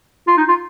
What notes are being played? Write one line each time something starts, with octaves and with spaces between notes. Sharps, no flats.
F4
D#4
F4